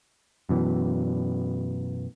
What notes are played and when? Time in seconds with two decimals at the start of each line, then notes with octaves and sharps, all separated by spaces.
0.49 F#2 B2 E3